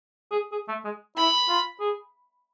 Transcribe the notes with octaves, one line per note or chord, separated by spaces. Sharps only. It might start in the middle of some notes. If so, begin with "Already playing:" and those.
G#4
G#4
A3
G#3
E4 B5
F4
G#4